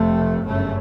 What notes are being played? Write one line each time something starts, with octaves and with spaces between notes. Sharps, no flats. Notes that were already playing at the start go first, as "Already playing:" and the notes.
Already playing: F1 F2 C3 A3
G1 F#2 C#3 A3